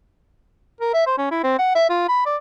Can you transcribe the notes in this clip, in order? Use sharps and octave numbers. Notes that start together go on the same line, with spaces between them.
A#4
E5
C5
C#4
E4
C4
F#5
E5
F4
B5
D5